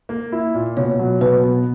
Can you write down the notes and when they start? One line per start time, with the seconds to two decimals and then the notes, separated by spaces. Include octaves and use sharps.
0.09 A#3
0.32 E4
0.55 A#2
0.77 B2 C#5
0.99 F#3
1.21 B2 B4
1.43 B3